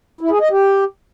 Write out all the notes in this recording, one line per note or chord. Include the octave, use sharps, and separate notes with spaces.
E4
G#4
D#5
G4